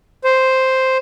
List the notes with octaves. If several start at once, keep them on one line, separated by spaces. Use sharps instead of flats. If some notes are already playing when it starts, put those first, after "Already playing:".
C5